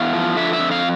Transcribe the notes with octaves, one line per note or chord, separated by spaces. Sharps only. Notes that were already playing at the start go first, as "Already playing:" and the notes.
Already playing: E2 F5
F3
D3 E5
E5
F2
F5